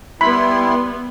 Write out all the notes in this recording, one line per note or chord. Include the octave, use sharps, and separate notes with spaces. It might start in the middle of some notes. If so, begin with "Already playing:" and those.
G3 B3 E4 B5 C6